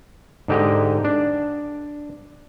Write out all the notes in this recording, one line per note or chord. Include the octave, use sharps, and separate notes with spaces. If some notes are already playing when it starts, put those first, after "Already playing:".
G#2 D3 D#4 G4 D#5
D4